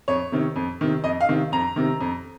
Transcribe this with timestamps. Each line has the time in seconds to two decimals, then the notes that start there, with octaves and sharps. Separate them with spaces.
0.08 F2 C#5
0.32 C3 D#3
0.56 F2
0.81 C3 D#3
1.04 F2 D#5
1.21 F5
1.28 C3 D#3
1.52 F2 A#5
1.76 C3 D#3
2.01 F2